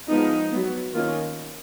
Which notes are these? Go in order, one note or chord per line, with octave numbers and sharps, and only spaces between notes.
F3 G#3 B3 D#4
F#3 B3
D#3 A#3 C#4 F4